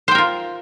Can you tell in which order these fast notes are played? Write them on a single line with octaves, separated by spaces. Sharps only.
C5 G5 A#4 F4